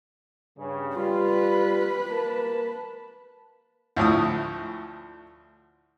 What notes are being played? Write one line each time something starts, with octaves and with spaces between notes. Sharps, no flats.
G2 C#3
G3 F4 B4
A#3 A#4 A5
D2 A2 F3 D#6